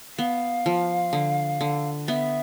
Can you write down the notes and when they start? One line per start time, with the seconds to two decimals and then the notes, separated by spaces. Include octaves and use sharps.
0.18 B3 F5
0.66 F3
1.13 D3
1.61 D3
2.08 B3 E5